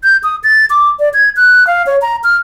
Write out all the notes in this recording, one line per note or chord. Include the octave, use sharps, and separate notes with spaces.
G6
D#6
A6
D6
D5
G#6
F#6
F5
C#5
A#5
F6